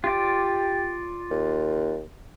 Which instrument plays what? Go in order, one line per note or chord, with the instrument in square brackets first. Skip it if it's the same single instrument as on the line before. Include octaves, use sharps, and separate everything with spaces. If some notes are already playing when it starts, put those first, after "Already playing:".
[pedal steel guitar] F4 D5 [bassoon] G4
[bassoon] D#2